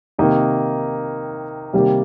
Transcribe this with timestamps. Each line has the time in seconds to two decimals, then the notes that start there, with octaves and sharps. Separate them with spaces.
0.18 C3 D#3 A#3 D#4
1.73 C3 D#3 G3 A#3